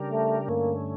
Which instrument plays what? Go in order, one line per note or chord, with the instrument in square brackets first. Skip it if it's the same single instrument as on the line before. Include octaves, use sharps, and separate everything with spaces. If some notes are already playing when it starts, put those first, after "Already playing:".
Already playing: [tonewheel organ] C#3 G3 D4 G4 A#4
[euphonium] A3
[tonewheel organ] G2 D3 A3 C#4 [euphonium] A#3